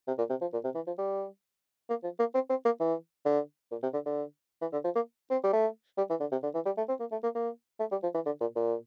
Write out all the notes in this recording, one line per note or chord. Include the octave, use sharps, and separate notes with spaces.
C3
A#2
C3
F3
A#2
C3
E3
F3
G3
A#3
F3
A#3
C4
C4
A#3
E3
D3
A#2
C3
D3
D3
E3
D3
F3
A#3
C4
G3
A3
G3
E3
D3
C3
D3
E3
G3
A3
C4
A#3
A3
A#3
A#3
A3
G3
F3
E3
D3
A#2
A#2